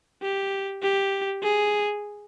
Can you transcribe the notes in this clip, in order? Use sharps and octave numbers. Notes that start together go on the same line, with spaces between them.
G4
G4
G#4